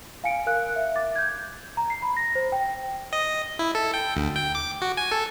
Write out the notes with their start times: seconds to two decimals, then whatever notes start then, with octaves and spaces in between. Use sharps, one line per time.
0.24 F5 G#5 C#7 D7
0.46 A#4 F5 F#6
0.76 E5
0.96 D6 A6
1.16 G6 G#6
1.77 A#5
1.90 C7
2.02 B5
2.17 A#6
2.35 C5
2.52 G5
3.13 D#5
3.59 E4
3.75 A4
3.94 G5
4.16 D2
4.36 G5
4.55 D6
4.82 F#4
4.97 G#5
5.12 A4